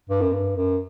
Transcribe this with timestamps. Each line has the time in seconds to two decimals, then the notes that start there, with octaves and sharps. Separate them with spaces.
0.10 G2
0.21 F#2
0.32 G2
0.56 F#2